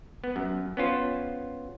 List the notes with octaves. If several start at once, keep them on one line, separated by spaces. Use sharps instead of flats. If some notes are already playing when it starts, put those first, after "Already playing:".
B3
F#2
B3 C#4 F4 C5